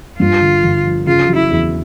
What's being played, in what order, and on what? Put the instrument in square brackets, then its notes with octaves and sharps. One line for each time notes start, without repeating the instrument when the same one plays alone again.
[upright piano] G2 [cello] F4
[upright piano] D3
G1
F3
[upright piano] C#3 [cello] F4
[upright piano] F#3
[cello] E4
[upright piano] E2